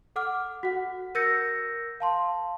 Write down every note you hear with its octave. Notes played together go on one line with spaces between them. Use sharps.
A4 F#5 D6 F6
F#4 F#5
A#4 E6 G6 A6 A#6 C#7
F5 A5 C6